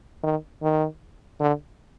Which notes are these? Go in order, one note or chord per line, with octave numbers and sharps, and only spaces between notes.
D#3
D#3
D3